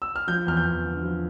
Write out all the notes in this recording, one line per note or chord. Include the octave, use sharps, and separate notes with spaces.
E6
F6
F3 G6
E2 F6
G6
E2
D3
F3